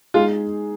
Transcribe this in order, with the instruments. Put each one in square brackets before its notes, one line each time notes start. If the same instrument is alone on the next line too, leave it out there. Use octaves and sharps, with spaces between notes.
[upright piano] G#3 D#4 G#4 [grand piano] F4